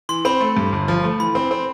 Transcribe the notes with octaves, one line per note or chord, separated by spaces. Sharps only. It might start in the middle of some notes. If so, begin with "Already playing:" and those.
E3 C6
C4 B5
A3
G2
G1
F3
A3
E3 B5
C4
C4